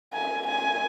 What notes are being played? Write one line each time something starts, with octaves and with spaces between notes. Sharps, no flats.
G#5
G#5